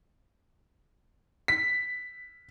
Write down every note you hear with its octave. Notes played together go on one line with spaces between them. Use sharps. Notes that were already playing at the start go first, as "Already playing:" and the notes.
B6